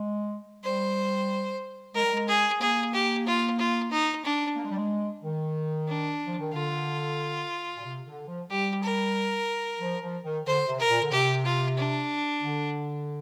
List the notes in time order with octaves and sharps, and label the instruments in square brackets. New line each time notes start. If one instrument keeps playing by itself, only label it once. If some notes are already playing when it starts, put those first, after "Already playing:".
Already playing: [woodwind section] G#3
[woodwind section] G3 [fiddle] C5
[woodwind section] G#3 [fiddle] A#4
[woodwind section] G3
G#3
[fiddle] G#4
[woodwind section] A#3 [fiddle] G#4
[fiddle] G4
F4
F4
D#4
D4
[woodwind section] A#3
G#3
G3
G#3
D#3
[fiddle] D4
[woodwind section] F3
D#3
[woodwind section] D3 [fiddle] F4
[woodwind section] A#2
C3
D3
F3
[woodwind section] G3 [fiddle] G4
[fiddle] A#4
[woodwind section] F3
F3
D#3
[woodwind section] D3 [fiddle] C5
[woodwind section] C3
[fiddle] A#4
[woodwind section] A#2
D3
[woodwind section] C3 [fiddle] G4
[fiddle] F4
D4
[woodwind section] D3